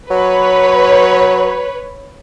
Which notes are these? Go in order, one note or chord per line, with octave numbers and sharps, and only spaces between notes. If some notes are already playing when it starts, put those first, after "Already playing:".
F#3 B4 C#5